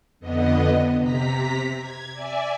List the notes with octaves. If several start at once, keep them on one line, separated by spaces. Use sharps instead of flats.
F2 D3 B3 D#5
C3 A#5 B6
G#6
D5 E5 G#5